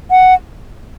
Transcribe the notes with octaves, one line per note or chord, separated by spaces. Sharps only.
F#5